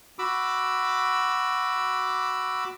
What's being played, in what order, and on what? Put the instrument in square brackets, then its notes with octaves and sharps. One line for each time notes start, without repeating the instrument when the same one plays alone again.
[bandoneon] F#4 B5 D6 E6